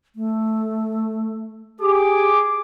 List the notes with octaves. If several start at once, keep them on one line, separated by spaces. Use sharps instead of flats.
A3
G4 G#4 D6